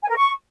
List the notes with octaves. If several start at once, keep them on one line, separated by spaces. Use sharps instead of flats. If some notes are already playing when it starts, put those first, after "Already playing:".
G#5
A#4
C#6